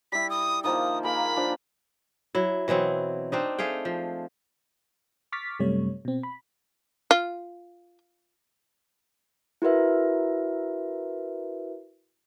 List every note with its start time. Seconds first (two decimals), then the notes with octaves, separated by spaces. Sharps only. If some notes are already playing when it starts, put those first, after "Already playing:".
0.12 G3 E4 B6
0.30 D#6
0.64 D#3 F3 A#3 D#6
1.03 A#3 G#4 A#4 B5
1.37 F3 D4
2.35 F#3 E4
2.68 B2 E3 F#3 C4
3.32 C4 D4 D#4
3.59 A3 G#4 F5 G5
3.85 F3
5.32 C#6 D6 F6 A6 B6
5.60 F#2 C3 G3 A3 C#5
6.05 B2 C4
6.23 B5
7.11 F4
9.62 E4 F#4 A#4 B4 E5